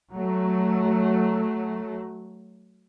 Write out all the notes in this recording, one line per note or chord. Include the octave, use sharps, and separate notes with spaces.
F#3 A3